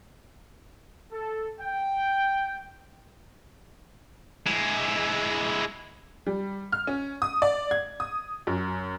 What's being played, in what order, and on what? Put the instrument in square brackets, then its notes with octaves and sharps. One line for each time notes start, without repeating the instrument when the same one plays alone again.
[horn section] A4
G5
[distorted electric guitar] G#3 E4
[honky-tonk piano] G3
F6
C#4
D#6
D5
G#6
D#6
F#2